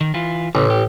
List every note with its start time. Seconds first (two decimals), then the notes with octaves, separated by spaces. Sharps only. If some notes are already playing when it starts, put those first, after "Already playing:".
0.01 D#3
0.14 E3 F4
0.55 A1 C#3
0.70 G4